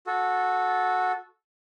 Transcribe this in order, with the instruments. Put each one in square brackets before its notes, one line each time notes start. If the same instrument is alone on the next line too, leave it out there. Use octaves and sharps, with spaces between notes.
[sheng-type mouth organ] F#4 A4